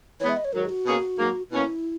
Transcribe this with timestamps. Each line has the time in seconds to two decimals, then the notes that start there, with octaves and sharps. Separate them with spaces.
0.20 E3 G#3 B3 C#5
0.29 E5
0.37 D#5
0.45 C#5
0.53 G#2 D#3 F#3 A#4
0.65 G#4
0.69 F#4
0.86 B2 A#3 C#4 G#4
1.18 G#2 F#3 A#3
1.51 B2 A#3 C#4 E4